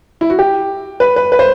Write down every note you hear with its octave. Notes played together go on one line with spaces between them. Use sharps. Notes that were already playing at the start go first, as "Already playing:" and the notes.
E4
F#4
G4
B4
B4
B4
C5